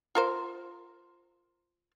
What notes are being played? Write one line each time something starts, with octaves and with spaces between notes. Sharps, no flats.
F4 A#4 C5